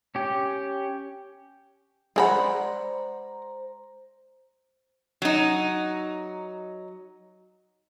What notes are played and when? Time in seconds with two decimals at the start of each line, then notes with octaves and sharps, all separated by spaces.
0.15 C#4 G4
2.16 G#3 G#4 C5 D5 F#5 A#5 B5
5.22 F#3 D#4